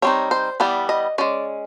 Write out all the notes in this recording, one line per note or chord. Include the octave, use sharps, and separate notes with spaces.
G3 C4 D#4 C#5
C5
E3 G3 B3 D5
D#5
G#3 C#4 D5